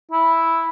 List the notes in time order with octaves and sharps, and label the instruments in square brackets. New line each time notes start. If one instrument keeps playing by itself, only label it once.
[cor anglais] E4